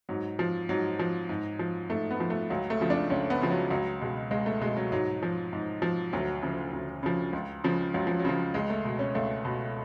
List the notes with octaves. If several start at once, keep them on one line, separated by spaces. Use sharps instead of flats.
G#2 F#3
F3
G#2 F#3
F3
G#2
F3
G#2 A3
B3
F3
A3
C#2 F#3
A3
C#3 F3
D4
C#2 C#4
B3
C#3 F3
F#3
C#2 F#3
B2 G#3
C#2 G#3
A3
B2 G#3
F#3
G#2 F#3
F3
G#2
F3
D2 F#3
C#3 F3
D2
C#3 F3
C#2
C#3 F3
C#2 F#3
F3
F#3
C#3 F3
C#2 G#3
A3
B2
C#4
C#2 A3
B2